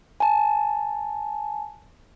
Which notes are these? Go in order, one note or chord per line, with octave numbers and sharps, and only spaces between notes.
G#5 A5